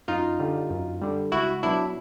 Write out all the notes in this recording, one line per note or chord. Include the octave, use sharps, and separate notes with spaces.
F#2 D#4 F4
D3 G3
F#2
D3 G3
C#2 E4 F#4
B2 F#3 D4 E4